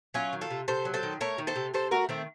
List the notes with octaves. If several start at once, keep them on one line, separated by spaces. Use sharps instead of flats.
F#3 C#4 F4
D#3
F4 A4
C3
C3 A4 C5
F#3
A4 C5
D#3
A3 A#4 C#5
D#3
A4 C5
C3
C3 A4 C5
A3 F#4 A#4
D#3 A3 C4